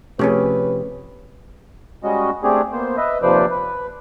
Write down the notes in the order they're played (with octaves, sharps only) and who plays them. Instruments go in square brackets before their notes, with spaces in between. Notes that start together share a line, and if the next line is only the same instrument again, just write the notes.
[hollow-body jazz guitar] C3 F3 G4 [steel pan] A3 C#4 G#4 [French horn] B4
[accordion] G3 G#3 C#4 F#4 D#5
A3 C4 D4 G4 G#4
A#3 B3 C5
B4 D#5 E5
D#2 C3 F3 B4 C5 D5
B4